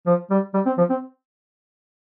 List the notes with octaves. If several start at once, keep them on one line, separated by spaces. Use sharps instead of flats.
F3
G3
G3
C4
F3
C4